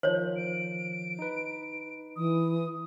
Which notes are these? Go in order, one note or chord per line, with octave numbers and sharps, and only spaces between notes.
D#3 F3 C5 C#5
D7
D#4 B4
E3 D#6